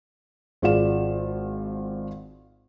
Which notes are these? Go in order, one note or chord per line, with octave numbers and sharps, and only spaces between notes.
G#1 G#3 F4 D5 F5 E7